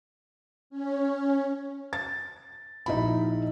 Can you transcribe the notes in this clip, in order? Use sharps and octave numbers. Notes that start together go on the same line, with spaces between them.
C#4
A6
A#1 D#4 E4 B5